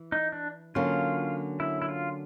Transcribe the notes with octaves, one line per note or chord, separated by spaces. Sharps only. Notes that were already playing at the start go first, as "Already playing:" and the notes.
Already playing: E3
D#4
D4
D3 F#3 A#3 C#4 F4
E4
E4
F4